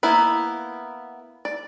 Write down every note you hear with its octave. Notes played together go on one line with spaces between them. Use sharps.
A#3 B3 E4
D5